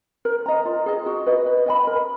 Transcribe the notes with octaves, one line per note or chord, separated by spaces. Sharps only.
A#4
D#5 A#5
F4
G#4 D#5
F#4
B4 D#5
B4
D#5 G#5 B5
A#4